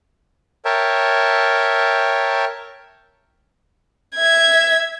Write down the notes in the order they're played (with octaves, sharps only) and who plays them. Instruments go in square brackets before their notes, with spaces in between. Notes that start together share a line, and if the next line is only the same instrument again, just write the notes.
[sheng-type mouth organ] A#4 C#5 E5 G5 A5
[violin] E5 G#6